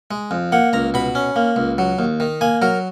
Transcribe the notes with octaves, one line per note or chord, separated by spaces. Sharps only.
G#3
F2
A#3 F#5
C#2 A#5
B2 B5
C#4
A#3
C#2
F#3
D#2
D#3
A#3 G#5
F#3 A#4